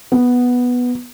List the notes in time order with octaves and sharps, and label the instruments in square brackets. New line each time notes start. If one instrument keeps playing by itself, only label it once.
[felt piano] B3